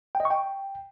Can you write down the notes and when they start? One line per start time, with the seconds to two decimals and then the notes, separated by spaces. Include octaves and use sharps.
0.15 G5
0.20 D#5
0.25 C#6
0.30 G5